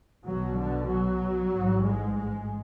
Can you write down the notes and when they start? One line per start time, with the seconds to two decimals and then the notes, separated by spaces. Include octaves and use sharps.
0.24 B1 B2 F#3
0.56 D3
0.87 F#3
1.50 A1 G#2
1.82 G#3
2.13 G#3